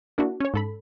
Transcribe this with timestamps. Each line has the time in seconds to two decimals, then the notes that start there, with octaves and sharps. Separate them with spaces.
0.18 A#3 D4 E4 F#4
0.40 C#4 C#5
0.54 G#2 A4 B5